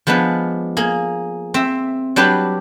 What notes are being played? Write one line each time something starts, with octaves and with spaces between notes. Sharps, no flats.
F3 G#3 B3 D4 B4
A#3 G#4
C4 E5
F#3 G3 D4 G4 B4